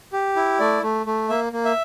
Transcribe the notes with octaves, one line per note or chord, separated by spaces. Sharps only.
G4
E4
A3 D5
A3
A3
A#3 E5
A#3
E5